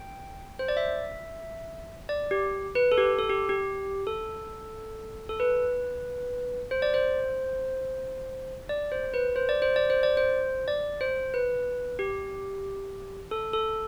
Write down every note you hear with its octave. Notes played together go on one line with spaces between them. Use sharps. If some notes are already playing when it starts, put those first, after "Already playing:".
Already playing: G5
C5
D5
E5
D5
G4
B4
A4
G4
A4
G4
G4
A4
A4
B4
C5
D5
C5
D5
C5
B4
C5
D5
C5
D5
C5
D5
C5
D5
C5
B4
G4
A4
A4